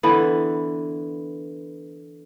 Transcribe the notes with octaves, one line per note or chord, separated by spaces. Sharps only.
D3 E3 B3